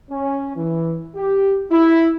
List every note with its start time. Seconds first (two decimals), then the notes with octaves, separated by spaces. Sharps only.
0.11 C#4
0.56 E3
1.16 G4
1.71 E4